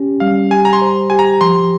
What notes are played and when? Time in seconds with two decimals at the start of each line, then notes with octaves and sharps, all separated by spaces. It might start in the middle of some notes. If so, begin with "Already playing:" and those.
Already playing: C#4 G4
0.20 G3 F5
0.51 G4 G#5
0.65 A#5
0.73 C6
0.82 C5
1.10 G4 G#5
1.19 A#5
1.41 F3 C6